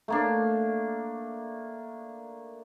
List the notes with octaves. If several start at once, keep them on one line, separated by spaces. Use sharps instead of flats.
A3 A#3 D4